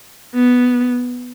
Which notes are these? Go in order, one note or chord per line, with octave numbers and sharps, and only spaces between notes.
B3